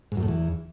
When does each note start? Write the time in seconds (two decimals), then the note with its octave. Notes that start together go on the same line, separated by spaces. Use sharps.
0.12 G#2
0.17 F#2
0.23 A2
0.28 E2